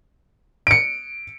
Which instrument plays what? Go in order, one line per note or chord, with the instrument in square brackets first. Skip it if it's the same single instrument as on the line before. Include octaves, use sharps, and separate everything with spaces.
[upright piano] C#7 D7